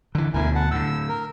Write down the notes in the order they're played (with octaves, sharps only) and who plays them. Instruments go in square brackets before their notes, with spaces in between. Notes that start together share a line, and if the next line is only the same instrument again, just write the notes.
[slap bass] D3 E3
[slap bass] D2 B2 D3 [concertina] E4 A#4 G#5
[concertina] F#5 A5
[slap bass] A2 D3 [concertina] E6
[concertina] A#4